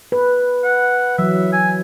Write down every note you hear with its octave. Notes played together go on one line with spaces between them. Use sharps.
B4
F#5
E3 F#3 E5
G#5